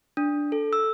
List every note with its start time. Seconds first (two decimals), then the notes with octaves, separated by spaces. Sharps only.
0.17 D4
0.52 A4
0.73 E6